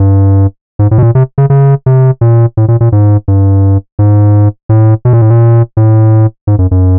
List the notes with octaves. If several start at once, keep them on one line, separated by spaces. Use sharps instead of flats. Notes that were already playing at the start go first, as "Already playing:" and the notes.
Already playing: G2
G#2
A2
B2
A#2
C3
C#3
C#3
C3
A#2
A2
A#2
A#2
G#2
G2
G#2
A2
B2
A#2
A2
A#2
A2
G#2
F#2
F#2